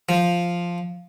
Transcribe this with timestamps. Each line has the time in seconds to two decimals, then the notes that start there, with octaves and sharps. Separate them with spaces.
0.09 F3